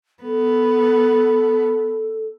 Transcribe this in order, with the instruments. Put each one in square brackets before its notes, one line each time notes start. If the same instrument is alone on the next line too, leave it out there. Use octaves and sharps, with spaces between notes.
[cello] B3 [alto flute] A4